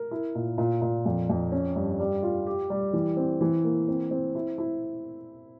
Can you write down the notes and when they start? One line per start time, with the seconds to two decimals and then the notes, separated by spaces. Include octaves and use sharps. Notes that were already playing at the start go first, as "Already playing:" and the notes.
Already playing: A#4
0.11 E4
0.35 A#2
0.58 A#2
0.82 A#2
1.06 F2
1.30 F2
1.52 C#4
1.76 G2
1.99 G3
2.23 F4
2.47 G4
2.70 G3
2.93 E3
3.17 C4
3.41 E3
3.64 A#3
3.88 C4
4.11 C4
4.35 E4
4.58 E4